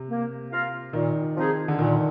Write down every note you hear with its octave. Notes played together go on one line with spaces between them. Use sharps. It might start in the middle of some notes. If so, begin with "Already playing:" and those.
Already playing: C3
A#3
F4 A#4 F5
A#2 D#3
F3 C4 D#4 G#4
D3
A#2 D#3